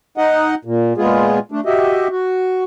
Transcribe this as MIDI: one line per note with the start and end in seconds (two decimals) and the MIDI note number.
0.18 0.55 63
0.18 0.55 75
0.18 0.55 78
0.65 0.93 46
0.98 1.39 46
0.98 1.39 56
0.98 1.39 59
0.98 1.39 65
0.98 1.39 68
1.52 1.60 57
1.52 1.60 62
1.66 2.08 66
1.66 2.08 67
1.66 2.08 75
1.66 2.08 76
2.11 2.64 66